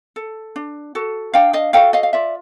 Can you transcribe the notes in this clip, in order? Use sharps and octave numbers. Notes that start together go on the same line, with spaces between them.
A4
D4
F#4 A4
D4 F5 G5
D#5 F5
F#4 A4 F5 G5
D#5 F5
F5
F4 D5 E5